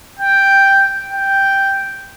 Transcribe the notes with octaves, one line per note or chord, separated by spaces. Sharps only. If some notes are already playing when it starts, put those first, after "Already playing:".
G5
G5